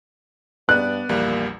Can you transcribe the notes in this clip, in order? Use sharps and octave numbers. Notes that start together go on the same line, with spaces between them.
G2 B3 D5 F#6
A#1 E2 G3 A#3